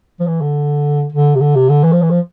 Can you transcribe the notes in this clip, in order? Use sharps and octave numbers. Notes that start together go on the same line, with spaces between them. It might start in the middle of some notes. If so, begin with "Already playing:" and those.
F3
E3
D3
D3
C3
D3
C3
D3
E3
F3
E3
F3